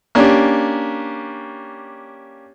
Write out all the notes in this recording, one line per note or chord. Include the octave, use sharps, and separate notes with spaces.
A#3 C#4 D4 G4